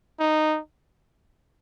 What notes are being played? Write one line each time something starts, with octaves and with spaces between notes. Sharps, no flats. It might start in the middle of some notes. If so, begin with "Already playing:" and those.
D#4